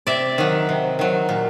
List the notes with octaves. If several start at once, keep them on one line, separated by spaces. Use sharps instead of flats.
C3 D5 E5
D#3 F#3
C3
D#3 F#3
A#2